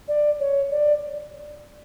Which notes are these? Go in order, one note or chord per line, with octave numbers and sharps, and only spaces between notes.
D5
C#5
D5